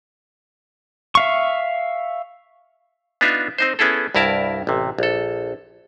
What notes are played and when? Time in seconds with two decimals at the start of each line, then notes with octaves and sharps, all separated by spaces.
1.15 E5 F5 C#6
3.21 B3 D4 D#4 F4 E5
3.58 C4 D#4 C5
3.79 B3 C#4 E4 G#4 A4
4.15 C2 G2 E4 A#4 A5
4.67 A1 C3
4.98 A#1 A4